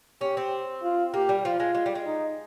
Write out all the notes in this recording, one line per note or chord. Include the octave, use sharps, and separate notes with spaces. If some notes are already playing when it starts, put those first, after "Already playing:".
C#4 G4
C4
F4
A#3 G4
G3
F3 F4
G#3
G#3
G3
G#3
D#4